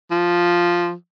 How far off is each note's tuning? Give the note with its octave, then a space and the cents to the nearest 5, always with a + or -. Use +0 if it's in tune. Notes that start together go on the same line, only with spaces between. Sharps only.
F3 +0